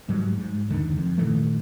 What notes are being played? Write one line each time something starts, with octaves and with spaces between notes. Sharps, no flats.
G#2 F#3 G3
G#2
F#1 D#2 D3 D#3
F2
A#2 D#3 E3 A3